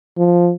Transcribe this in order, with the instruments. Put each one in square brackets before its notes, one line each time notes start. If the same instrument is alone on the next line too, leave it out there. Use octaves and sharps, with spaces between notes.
[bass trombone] F3